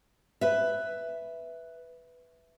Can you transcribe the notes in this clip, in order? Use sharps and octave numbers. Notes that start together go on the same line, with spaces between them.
B4 E5